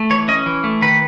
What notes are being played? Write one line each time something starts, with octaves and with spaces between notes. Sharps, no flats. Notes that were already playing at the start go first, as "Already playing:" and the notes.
Already playing: A3
E3 C#5
C#4 D#5
E3
A3
D#3 B4